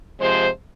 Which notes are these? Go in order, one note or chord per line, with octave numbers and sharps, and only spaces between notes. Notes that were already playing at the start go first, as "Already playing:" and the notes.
C3 F3 G#3 C5